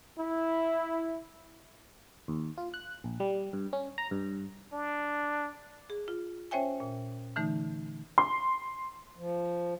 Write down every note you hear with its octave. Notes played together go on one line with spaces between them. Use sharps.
E4
D#2
F4
F#6
A#1
G3
G2
C#4
A#5
G2
D4
G#4
F4
C#4 C5 C#5 E5 G5 G#5
A#2
D3 E3 A3 D#4
C6
F3